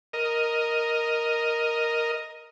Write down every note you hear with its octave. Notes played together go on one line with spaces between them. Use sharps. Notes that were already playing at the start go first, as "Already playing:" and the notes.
A#4 D#5